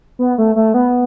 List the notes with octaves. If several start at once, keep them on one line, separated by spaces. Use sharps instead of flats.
B3
A3
A3
B3